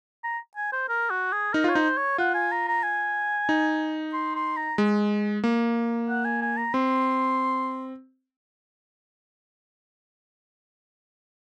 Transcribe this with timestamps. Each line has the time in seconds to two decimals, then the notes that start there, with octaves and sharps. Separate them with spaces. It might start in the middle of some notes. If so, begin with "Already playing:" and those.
0.23 A#5
0.56 G#5
0.72 C5
0.89 A#4
1.10 F#4
1.32 G#4
1.53 D#4 A#4
1.64 F4 C#5
1.75 D#4 C5
1.97 C#5
2.18 F4 F#5
2.34 G#5
2.52 A#5
2.68 A#5
2.83 G#5
3.49 D#4
4.13 C6
4.35 C6
4.57 A#5
4.78 G#3
5.44 A#3
6.09 F#5
6.25 G#5
6.42 G#5
6.57 A#5
6.74 C4 C6